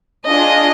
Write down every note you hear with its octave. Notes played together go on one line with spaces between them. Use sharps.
D4 F4 G#4 D#5